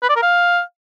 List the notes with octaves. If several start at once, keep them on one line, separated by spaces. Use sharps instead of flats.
B4
D5
A#4
F5